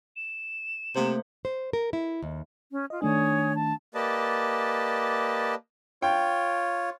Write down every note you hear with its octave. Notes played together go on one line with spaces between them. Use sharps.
E7
C3 A3 A#3 C5
C5
A#4
E4
D#2
C#4
F4 D#5
D#3 A3 D4 C#5 G#5 D#6
A5
A#3 G4 B4 D5 D#5 A5
F4 C#5 G5